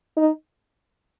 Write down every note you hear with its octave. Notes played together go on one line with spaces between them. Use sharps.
D#4